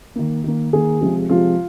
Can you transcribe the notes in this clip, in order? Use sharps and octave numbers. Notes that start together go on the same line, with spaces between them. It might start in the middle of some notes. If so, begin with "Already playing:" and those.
D#3 A#3
D#3 A#3
D#3 A#3 G#4
C3 F3 G#3
C3 F3 G#3 F4